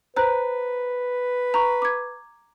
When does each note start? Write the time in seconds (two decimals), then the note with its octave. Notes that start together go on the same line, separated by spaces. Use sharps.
0.17 B4 C5 A#5 F#6
1.54 A#5 C#6
1.82 D6 G#6